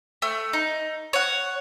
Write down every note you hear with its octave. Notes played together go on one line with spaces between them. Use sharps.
A3
D#4
C#5 F#5